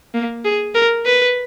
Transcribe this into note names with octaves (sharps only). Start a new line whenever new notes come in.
A#3
G#4
A#4
B4